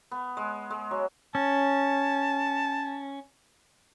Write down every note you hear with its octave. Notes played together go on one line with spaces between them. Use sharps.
B3
G#3
G#3
F#3
C#4 A5